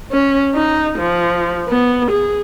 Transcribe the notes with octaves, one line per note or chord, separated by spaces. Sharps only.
C#4
D#4
F3
B3
G#4